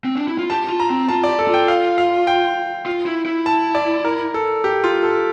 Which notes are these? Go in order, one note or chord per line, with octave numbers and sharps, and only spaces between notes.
C4
D4
E4
F4
G4 A5
F4
A#5
C4
F4 A5
D5
G4
A4
F4
G5
F5
F5
G5
F4
E4
E4
A5
D5
A#4
A4
G4
F4
A4